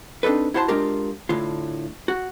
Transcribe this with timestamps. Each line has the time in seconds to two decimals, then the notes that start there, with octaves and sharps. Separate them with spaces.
0.23 C4 D4 D#4 A4 B4
0.54 E4 F#4 C5 E5 A5 C6
0.68 G#3 D4 F4 G4 A#4
1.29 A2 D3 F4
2.08 F#4